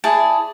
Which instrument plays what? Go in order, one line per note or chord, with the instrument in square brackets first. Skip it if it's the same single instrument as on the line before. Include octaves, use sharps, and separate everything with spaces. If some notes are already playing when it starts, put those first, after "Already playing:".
[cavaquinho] E4 G#4 D5 A5